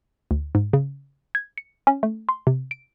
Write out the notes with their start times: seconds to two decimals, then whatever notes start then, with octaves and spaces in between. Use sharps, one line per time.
0.31 D2
0.55 G#2
0.73 C#3
1.35 G#6
1.58 C#7
1.87 C#4
2.03 A3
2.29 C6
2.47 C3
2.71 D7